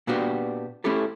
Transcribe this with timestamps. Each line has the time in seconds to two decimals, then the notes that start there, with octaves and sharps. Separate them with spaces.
0.07 A#2 B3 D4 F#4 G4
0.84 A3 C#4 E4 G4 A4